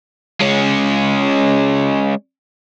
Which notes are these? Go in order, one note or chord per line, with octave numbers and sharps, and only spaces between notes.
G#3 C#4